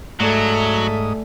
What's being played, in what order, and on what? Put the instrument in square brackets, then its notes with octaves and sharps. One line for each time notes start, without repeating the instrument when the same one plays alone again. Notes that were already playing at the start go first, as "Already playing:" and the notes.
[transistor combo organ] G#2 D#6 [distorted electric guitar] F#3 [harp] A3 D5 G#5 [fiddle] A4 E5